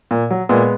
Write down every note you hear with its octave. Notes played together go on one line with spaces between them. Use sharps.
A#2
F#3
A#2 G#3 B3